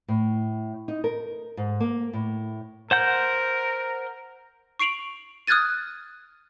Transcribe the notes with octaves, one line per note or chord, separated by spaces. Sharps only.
A2
D#4
A#4
G#2
A#3
A2
A#4 C5 F#5 G6
C#6 C7 D7 F7 F#7
D#6 F6 F#6 G#6 A6 D#7